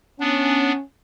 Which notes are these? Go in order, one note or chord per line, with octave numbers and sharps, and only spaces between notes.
B3 C#4 D4